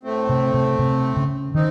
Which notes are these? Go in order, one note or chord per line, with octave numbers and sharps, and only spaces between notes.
A2 A3 C4
C3
C3
C3
C#3
D#3 C4 D#4